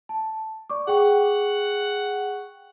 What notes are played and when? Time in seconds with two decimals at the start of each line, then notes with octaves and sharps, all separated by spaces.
0.09 A5
0.70 D5 C#6 D6
0.87 G#4 F#5 G5 C#6